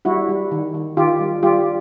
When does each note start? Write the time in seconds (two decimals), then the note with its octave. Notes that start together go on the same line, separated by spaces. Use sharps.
0.05 G3 E4 F#4
0.29 G3
0.51 D#3
0.74 D#3
0.97 D#3 F4 G4
1.20 G3
1.43 G3 F4 G4